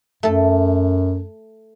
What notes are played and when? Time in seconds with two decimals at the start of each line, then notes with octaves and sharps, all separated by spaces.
0.23 F#2 A3 A4